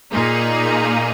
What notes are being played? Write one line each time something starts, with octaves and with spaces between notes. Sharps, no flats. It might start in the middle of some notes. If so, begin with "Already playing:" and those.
A#2 A#3 D#4 G#4